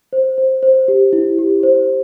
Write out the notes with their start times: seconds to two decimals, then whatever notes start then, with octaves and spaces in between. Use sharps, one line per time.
0.13 C5
0.38 C5
0.63 C5
0.88 G4
1.13 E4
1.38 G4
1.63 C5